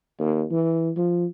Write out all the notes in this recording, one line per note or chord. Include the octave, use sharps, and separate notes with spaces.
D#2
E3
F3